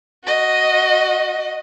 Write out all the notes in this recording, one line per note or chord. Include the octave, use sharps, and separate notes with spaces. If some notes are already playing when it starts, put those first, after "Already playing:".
F#4 D#5